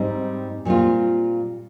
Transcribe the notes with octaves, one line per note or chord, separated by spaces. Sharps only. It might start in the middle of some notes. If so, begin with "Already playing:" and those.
Already playing: G#2 G3 C4 D#4
A#2 G3 C4 F4